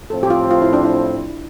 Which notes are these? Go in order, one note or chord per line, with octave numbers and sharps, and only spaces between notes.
A2 F3 C4 A4
G4
F4
F4
E4
D4
E4